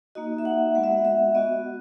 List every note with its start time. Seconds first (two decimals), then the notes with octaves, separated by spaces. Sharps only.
0.15 A#3 D#4 F#4 D#5
0.38 E5
0.45 F#5
0.75 G#3 B3 F#4 F#5
0.84 E5
0.92 F#5
1.05 E5
1.35 B3 F#4 D#5